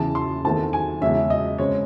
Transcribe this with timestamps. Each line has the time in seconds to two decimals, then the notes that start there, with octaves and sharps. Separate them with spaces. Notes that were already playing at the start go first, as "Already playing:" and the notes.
Already playing: E2 C#3 E3 A5
0.15 C6
0.44 E2 D#3 A3 C4 A5
0.73 G#5
1.01 E2 C#3 G#3 C#4 E5
1.30 D#5
1.58 C#3 G#3 C4 C#5